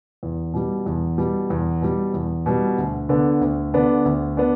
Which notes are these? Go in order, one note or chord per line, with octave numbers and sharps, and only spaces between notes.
E2
B2 G3
E2
B2 G3
E2
B2 G3
E2
B2 G3
D2
D3 B3 D4
D2
D3 B3 D4
D2
B3 D4